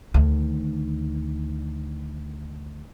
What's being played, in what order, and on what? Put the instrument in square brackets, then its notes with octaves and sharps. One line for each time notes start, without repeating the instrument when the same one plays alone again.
[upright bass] D2 D#3